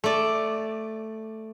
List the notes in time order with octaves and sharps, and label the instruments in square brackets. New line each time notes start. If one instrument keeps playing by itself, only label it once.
[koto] A3 D5